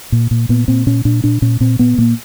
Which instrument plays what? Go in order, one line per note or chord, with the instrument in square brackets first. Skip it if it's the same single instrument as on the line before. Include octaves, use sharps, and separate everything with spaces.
[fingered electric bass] A#2
A#2
A#2 B3
A#2 C4
A#2 C#4
A#2 D4
A#2 D4
A#2 C#4
A#2 C4
A#2 B3
A#2 A#3